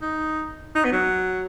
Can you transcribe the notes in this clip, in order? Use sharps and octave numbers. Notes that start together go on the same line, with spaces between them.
D#4
D#4
B3
F#3